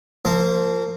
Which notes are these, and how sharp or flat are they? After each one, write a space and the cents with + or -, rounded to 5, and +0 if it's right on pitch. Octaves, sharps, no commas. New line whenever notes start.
F3 +0 A#3 -30 C5 +0